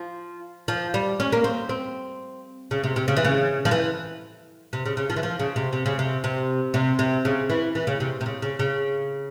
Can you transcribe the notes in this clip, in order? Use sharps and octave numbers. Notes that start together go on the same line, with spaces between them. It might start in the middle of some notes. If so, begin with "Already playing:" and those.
Already playing: F3
F3
G3
C#4
A#3
C4
C4
C#3
C3
C3
C#3
E3
C#3
F3
E3
C3
C#3
C#3
F3
E3
F3
C#3
C3
C3
C#3
C3
C3
C3
C3
C#3
E3
E3
C#3
C3
C3
C#3
C#3
C#3